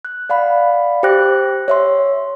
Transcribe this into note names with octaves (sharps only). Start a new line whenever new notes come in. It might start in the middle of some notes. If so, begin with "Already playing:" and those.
F#6
D5 F5 F#5 B5
G4 C5 G5 D6 F#6 A#6
C#5 E5 C6